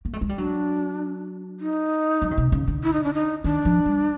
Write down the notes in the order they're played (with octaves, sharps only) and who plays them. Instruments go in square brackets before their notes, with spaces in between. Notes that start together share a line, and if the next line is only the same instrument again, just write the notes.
[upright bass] A#3
A3
G#3
G3
[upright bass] F#3 [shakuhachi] D4
[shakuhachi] D#4
[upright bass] F#3
C#3
C3
C#3
D3
[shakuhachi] E4
D#4
D4
D#4
[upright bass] D#3 [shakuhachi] D4
[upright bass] F3
G3